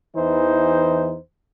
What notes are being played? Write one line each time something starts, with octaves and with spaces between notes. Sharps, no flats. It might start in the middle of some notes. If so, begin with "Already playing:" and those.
E2 E3 D#4 C5